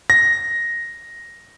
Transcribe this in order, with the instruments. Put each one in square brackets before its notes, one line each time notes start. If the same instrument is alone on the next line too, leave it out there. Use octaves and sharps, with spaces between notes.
[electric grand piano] A#6